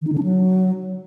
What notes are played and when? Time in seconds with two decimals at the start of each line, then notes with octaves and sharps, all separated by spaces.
0.02 D#3
0.07 D#4
0.12 D3
0.18 D4
0.23 F#3